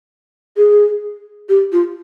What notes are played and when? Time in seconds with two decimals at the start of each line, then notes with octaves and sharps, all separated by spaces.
0.56 G#4
1.49 G4
1.72 F4